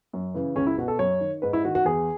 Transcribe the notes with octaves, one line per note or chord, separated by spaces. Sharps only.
F#2
C#3 E3
C#2 C#4
E4
B2 F#4
A4
F#2 C#5
D#3
G#2 B4
E4
D#3 F#4
F#4
E2 G#4